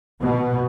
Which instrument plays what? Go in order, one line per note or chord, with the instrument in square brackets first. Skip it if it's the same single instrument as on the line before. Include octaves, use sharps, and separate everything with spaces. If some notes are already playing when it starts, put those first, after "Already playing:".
[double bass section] B2